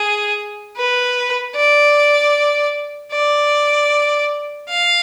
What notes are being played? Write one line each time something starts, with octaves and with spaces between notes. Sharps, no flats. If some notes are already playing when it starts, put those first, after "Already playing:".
Already playing: G#4
B4
D5
D5
F5